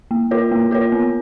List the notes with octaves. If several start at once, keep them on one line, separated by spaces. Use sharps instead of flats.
A#3
F4 A#4 C#5
A#3
F4 A#4 C#5
B3